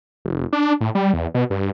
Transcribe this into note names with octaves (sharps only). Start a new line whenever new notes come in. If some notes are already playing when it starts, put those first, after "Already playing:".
F1
D4
A2
G3
E2
B2
G2